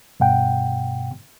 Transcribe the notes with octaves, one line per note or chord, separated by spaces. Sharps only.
G2 B2 F#5 G5